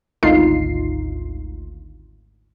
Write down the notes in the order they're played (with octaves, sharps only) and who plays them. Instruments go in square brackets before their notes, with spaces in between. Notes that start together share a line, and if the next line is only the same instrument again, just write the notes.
[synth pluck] G#1 D2 D#4 F4 C7